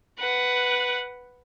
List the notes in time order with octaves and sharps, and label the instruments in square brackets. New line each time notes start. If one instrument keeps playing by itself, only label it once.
[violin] B4 F#5